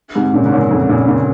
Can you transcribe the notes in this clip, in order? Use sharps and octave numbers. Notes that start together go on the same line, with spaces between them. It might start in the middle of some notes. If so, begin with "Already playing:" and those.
G#2 C3
A#2 C#3
G#2
F#2 A#2
F2 G#2
F#2 A#2
A#2 C#3